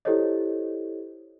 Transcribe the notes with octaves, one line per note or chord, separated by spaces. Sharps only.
E4 G4 A4 C5 C#5 D#5